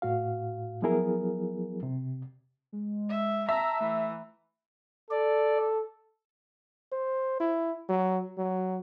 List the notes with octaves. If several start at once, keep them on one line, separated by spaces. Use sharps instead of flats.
A2 F#4 F5
F3 F#3 B3 E4 G#4 A#4
C3
G#3
E5
E5 A5 A#5
E3 A3
A4 D5
C5
E4
F#3
F#3